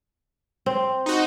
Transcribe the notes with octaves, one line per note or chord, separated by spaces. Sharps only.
C4
D#4 F#4